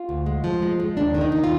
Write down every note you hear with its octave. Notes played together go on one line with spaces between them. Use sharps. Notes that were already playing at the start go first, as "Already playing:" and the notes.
Already playing: F4
D2
G#3
F3
G#3
G#3
D#2 D4
D#3
D#4
D#3
F4